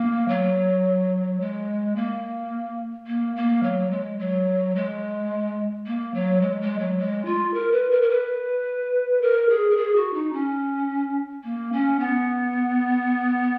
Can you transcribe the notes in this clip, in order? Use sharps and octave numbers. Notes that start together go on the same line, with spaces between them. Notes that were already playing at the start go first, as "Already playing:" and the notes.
Already playing: A#3
F#3
G#3
A#3
A#3
A#3
F#3
G#3
F#3
G#3
A#3
F#3
G#3
G#3
F#3
G#3
F4
A#4
B4
A#4
A#4
B4
A#4
G#4
A#4
G#4
F#4
D#4
C#4
A#3
C#4
B3